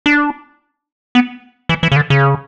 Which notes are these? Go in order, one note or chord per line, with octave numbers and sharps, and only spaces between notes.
D4
B3
E3
E3
C#3
D3
C#3